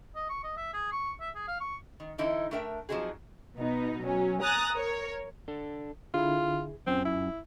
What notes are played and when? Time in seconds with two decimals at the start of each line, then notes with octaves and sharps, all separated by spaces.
0.16 D#5
0.30 C#6
0.44 D#5
0.57 E5
0.74 G#4
0.92 C#6
1.21 E5
1.36 G#4
1.48 F5
1.61 C#6
2.00 D#3
2.18 D3 E3 D#4 E4
2.51 A3 D4 A#4 E5 G5
2.89 F3 F#3 C4 D#4 F#4 G#4
3.56 B2 B3 D#4
4.02 F#3 C#4
4.41 G#5 A#5 D#6 F#6 A6 A#6
4.72 A#4 C#5
5.48 D4 A4
6.14 D3 E4 F4 G#4
6.87 F#2 F#3 C4 C#4 F4
7.05 E4